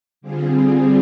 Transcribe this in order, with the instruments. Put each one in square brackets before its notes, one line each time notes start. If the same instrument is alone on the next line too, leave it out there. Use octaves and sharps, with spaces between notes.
[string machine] D3 G3 C4 F4 G#4